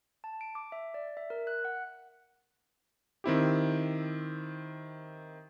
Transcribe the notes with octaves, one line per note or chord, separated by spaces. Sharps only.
A5
D7
D6
E5
D5
E5
A#4
F#6
F#5
D#3 C4 E4 G4